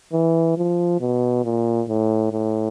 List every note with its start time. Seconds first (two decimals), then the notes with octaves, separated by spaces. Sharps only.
0.13 E3
0.57 F3
1.00 B2
1.44 A#2
1.89 A2
2.32 A2